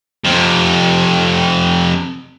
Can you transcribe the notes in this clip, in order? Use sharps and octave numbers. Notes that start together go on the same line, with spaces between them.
F2 C3